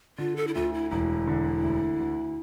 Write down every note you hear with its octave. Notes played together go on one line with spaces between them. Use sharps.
D3 F4
A4
E4
D2 F4
E4
E1 E4
D3
D2
D2